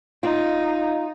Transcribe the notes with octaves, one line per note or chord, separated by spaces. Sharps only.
D#4 F4